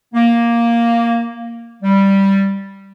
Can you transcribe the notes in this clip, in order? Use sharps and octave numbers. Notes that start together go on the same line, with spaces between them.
A#3
G3